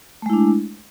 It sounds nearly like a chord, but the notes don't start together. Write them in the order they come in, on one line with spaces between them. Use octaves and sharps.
A3 G#3 E4 D4